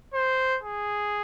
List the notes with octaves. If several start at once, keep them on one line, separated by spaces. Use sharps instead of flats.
C5
G#4